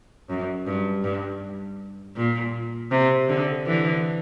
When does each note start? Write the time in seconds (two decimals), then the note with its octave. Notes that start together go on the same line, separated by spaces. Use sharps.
0.30 F#2
0.66 G2
1.04 G2
2.17 A#2
2.91 C3
3.29 D3
3.66 D3 E3